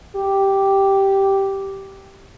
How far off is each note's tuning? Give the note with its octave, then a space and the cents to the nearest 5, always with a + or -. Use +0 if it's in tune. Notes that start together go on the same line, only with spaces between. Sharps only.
G4 -5